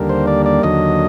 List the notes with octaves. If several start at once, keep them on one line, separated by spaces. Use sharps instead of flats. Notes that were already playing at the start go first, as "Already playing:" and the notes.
Already playing: D#2 D3 G3 A#3
C5
D5
D5
D#2 D3 F#3 D#5